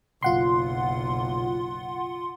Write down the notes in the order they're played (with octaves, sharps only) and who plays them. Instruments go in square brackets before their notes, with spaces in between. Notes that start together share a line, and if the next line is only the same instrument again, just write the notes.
[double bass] F#1 B1 [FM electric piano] F4 F#5 C6